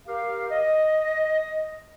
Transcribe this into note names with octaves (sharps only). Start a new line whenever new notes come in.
G4 A#4 F5
D#5